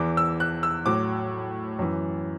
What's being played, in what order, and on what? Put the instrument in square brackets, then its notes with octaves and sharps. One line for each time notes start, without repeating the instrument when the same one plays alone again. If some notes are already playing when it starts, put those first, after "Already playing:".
Already playing: [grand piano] E2 E3 D6
E6
F#6
E6
A2 F#3 D6
F#2 E3